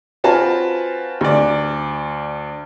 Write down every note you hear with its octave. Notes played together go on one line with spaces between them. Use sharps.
C4 F4 F#4 B4 G#5 A5
D2 D5